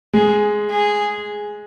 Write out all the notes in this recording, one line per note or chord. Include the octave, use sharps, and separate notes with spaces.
G#3 G#4
G#4